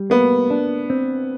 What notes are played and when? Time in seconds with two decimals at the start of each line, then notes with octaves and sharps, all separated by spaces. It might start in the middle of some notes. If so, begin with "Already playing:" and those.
Already playing: G3
0.10 A#3 B3
0.50 D4
0.90 C4